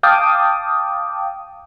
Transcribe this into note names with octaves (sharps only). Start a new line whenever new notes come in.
F5 G5 A5 D6 D#6